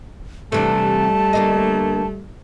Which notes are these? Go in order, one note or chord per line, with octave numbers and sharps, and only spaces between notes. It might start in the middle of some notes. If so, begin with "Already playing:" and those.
C3 E3 G3 A3 D4 A5
D2 A#3 D#5